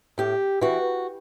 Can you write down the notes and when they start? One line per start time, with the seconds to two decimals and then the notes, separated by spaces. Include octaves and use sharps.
0.18 A2 G4
0.61 E3 F#4